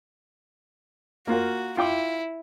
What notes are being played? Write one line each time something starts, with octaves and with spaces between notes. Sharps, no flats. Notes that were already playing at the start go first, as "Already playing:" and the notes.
A#3 F4 F#4 A#4
E4 F4 G5 D6